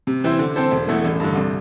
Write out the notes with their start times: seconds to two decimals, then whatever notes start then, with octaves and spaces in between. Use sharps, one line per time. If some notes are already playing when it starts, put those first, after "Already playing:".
0.07 C3
0.24 E3 C4 E4 C5
0.39 D3
0.56 C4 A4 C5
0.71 E1
0.88 E2 E3 A3 E4
1.04 A1
1.20 G2 D3
1.35 C2